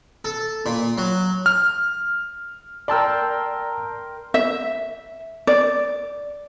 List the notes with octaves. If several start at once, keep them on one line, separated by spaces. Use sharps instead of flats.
A4
A#2
F#3
F6
A#4 D5 G5 A5 C6 E6
E5
D5